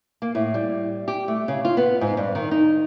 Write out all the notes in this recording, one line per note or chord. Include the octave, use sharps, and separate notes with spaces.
A#3
A2
G3
G4
A3
C#3
F4
B3
G#2
G2
D#3
D#4